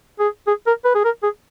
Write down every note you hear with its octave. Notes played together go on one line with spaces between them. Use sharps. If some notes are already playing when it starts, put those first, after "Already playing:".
G#4
G#4
A#4
B4
G#4
A#4
G#4